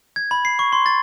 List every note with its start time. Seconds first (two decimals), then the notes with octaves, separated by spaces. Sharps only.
0.16 G#6
0.31 B5
0.45 C7
0.59 C#6
0.72 C6
0.86 A6